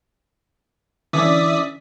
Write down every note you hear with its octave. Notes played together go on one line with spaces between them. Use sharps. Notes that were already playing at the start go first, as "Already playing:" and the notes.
D3 E3 C#4 D5 E5 D#6 B6